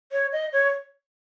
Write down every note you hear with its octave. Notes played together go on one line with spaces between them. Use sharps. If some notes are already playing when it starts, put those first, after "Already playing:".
C#5
D#5
C#5